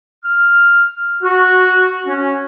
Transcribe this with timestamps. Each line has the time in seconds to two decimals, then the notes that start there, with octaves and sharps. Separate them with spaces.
0.24 F6
1.23 F#4
2.06 C#4